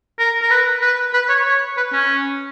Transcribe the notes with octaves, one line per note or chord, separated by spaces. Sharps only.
A#4
A#4
B4
B4
B4
C#5
C#5
B4
C#4